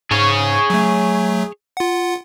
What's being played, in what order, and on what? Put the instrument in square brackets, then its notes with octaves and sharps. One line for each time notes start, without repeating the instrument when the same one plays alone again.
[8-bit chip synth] G#2 [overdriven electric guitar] G#4 C#5
[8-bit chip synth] F#3 A3
F4 F#5